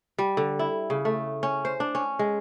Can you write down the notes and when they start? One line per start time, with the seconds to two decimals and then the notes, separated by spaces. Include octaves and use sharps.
0.18 G3
0.37 D3
0.59 E4
0.90 C#3
1.05 A3
1.43 C#4
1.65 C5
1.80 D4
1.95 C#4
2.19 G#3